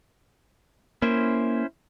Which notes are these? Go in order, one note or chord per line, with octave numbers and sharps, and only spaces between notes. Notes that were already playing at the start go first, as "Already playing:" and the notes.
A#3 C#4 E4 C5